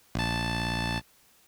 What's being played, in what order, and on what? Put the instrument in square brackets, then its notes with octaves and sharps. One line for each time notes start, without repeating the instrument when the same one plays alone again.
[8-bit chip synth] A#1 A5